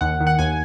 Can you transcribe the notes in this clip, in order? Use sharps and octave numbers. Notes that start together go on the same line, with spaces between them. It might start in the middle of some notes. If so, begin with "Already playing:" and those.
D#2 F#5
D#3
F#5
D#2 G#5